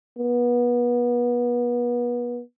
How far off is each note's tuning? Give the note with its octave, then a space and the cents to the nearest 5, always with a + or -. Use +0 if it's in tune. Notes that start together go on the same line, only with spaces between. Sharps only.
B3 -30